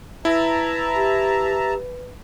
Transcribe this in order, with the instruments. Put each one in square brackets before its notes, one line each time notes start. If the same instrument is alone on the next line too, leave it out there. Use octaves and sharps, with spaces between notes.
[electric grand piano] E4 [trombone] B4 [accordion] E5 A5 A#5
[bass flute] G4